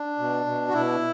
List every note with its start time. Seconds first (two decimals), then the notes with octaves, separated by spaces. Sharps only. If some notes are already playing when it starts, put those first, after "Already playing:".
Already playing: D4
0.19 B2
0.46 B2
0.69 F#4
0.73 B2 E4